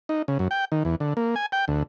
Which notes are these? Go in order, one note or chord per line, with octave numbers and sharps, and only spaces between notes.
D#4
C#3
F#2
G5
D#3
E2
D3
A#3
G#5
G5
D2